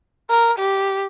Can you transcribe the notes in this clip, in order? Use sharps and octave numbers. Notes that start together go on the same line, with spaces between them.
A#4
G4